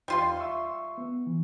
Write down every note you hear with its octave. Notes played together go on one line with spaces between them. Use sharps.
E2 G3 F4 C6
E5 C#6 E6
B3
E3